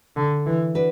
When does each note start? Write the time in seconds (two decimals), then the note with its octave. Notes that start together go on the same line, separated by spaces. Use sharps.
0.16 D3
0.46 E3
0.75 D4 F#4 B4